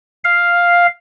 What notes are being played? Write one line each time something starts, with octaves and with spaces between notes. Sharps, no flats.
F5